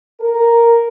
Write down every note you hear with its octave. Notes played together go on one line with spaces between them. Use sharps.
A#4